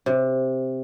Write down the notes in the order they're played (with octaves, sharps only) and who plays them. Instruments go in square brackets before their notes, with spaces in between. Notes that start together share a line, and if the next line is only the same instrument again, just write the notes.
[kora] C3